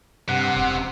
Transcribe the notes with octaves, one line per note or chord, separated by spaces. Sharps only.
G2 C3 F#5
E1